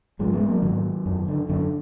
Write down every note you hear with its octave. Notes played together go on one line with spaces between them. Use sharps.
G#2 F3 G#3
G#3 B3
F#3 A#3
G#2 D#3 F#3
F#2
D3
F#2 D3